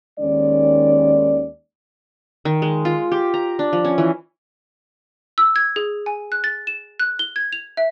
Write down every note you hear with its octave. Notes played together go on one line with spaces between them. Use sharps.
D#2 D#3 G#3 C#4 D5
D#3
G#3
F4
G4
A#5
D4
F3
C#4
E3
E6
G#6
G#4
G#5
F#6
A6
E7
F#6
G7
G#6
F7
E5